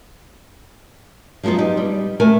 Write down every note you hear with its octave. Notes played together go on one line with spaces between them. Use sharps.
F3 F#3 G#3 B3 F4
D#4 G4
G3
A3 A#4 G#5